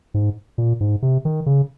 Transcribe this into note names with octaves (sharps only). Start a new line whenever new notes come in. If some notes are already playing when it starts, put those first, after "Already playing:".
G#2
A#2
G#2
C3
D#3
C#3